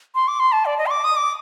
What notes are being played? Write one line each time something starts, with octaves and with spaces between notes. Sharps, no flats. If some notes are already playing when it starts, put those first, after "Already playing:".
C6
D6
C6
A5
D5
D#5
C6
D6
D#6
D6